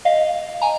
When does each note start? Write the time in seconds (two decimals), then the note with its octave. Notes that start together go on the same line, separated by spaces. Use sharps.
0.05 D#5 F5
0.62 G#5 A#5